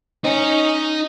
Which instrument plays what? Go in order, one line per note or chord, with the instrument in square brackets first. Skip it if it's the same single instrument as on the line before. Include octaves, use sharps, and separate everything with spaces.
[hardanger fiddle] C#4 [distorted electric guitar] D#4 D#5